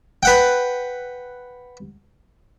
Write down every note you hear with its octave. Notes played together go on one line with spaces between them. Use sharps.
B4 F#5 G5